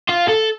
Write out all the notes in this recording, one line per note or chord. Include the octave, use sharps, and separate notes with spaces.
F4
A4